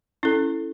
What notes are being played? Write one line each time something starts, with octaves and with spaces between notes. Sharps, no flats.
C#4 E4 A4